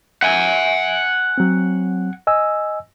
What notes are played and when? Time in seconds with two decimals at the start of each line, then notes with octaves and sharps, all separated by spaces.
0.23 F#5 G#5
1.38 F#3 C4
2.27 D#5 G#5 E6